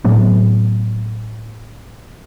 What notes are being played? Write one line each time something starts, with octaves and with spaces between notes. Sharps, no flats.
A2 F#3 A3 B3